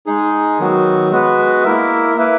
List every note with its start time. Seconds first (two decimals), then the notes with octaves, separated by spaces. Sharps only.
0.06 G#3 D#4 G#4
0.59 D#3 F#3 B3 F#4
1.11 G#3 B3 F#4 B4
1.63 A#3 E4 A#4 E5
2.16 A#3 E4 B4 E5